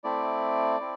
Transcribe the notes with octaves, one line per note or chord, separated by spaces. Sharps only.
A3 C4 E4 D5
C4 E4